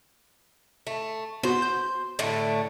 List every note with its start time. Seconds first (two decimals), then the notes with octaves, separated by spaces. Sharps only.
0.87 A3
1.43 B3 F#4 C5
1.62 G6
2.19 A2 D3 A3